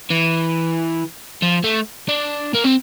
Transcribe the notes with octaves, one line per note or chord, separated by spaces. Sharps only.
E3
F3
A3
D4
A#3
C4